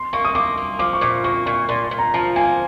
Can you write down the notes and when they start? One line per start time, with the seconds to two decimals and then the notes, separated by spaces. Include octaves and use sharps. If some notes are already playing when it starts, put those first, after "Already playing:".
Already playing: C6
0.13 A#3 C#6
0.25 D#6
0.35 A#3 D6
0.58 A#3
0.79 F3 D6
0.93 C#6
1.01 A#2 D6
1.24 A#3 C#6
1.46 A#2 C#6
1.69 A#2 C6
1.84 C6
1.91 A#2
1.99 A#5
2.14 F3 A5
2.36 A#3 G#5